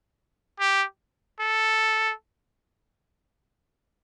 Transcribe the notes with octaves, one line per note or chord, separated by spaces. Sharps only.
G4
A4